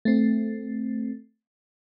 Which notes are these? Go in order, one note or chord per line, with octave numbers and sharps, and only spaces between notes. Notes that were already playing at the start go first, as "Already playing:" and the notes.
A3 C4